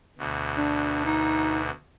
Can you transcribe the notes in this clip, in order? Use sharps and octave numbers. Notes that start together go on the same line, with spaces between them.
D2 B2
D4
D#4